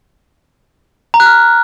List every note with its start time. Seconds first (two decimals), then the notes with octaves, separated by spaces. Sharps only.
1.14 A#5
1.20 F#6
1.26 F6